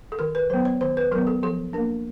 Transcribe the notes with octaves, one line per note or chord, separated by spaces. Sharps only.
A4
D#3 A#4
B4
F#3 B3 C5
C#5
D#3 C5
B4
F#3 B3 A#4
A4
F3 A4
A#3 D4 A#4